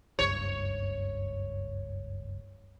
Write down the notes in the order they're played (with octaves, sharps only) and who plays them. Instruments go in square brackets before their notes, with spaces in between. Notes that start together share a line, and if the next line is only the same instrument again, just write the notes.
[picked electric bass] F#1 C#2 G2 [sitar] C#5